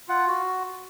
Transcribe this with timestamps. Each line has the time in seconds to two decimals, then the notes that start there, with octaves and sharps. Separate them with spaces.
0.09 F4 F#5
0.27 F#4